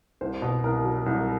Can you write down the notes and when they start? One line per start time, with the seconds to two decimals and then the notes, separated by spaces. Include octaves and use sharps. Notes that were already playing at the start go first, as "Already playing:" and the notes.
0.21 C2 C5
0.42 B2
0.64 C2 A#4
0.85 F#3
1.06 C2